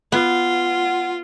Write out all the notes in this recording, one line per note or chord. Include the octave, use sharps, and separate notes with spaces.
B3 F4 F#5